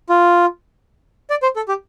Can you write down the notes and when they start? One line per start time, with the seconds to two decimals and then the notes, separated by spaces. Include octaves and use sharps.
0.09 F4
1.30 D5
1.43 C5
1.56 A4
1.68 G4